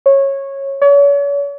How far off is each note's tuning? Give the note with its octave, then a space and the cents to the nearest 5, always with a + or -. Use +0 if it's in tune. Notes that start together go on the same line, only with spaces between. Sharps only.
C#5 -15
C#5 +40